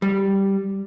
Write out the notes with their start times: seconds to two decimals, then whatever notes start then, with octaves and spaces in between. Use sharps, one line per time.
0.02 G3